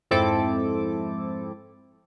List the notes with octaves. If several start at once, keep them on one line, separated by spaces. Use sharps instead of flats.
F2 G#2 C4 E4 A4 D6